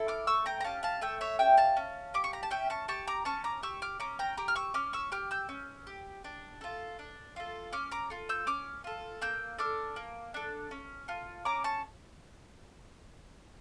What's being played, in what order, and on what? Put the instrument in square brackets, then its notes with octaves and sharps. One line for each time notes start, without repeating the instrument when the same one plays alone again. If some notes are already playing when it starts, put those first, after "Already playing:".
Already playing: [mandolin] E4 A4
D6 F6
A3 C#6 E6
G5 A#5
A#5
C#4 G4 F5 A5
F5 A5
A3 E5 G5
C#5 E5
C#4 G4 E5 G5
F5 A5
C#4
G4 D6
C#6
A#5
A5
C#4 E5 G5
A5 C#6
G4 A5 C#6
A#5 D6
C#4 A5 C#6
A#5 D6
G4 C#6 E6
D6 F6
C#4 A#5 D6
G5 A#5
G4 A#5 D6
F6
C#6 E6
C#4 D6 F6
C#6 E6
G4 D6 F6
E6 G6
C#4
G4
D4
F4 A4
D4
F4 A4
C#4 D6 F6
A#5 D6
F4 A4
E6 G6
C#4 D6 F6
F4 A4
A#3 E6 G6
D4 A4 D6 F6
A#3
D4 A4
C#4
F4 A4
C#4 A#5 D6
A5 C#6